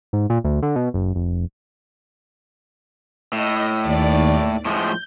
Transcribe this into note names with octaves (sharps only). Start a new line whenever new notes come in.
G#2
A#2
D2
D3
B2
F#1
F1
A2 D#5
D#2 D5
A2 F3 G#3 G6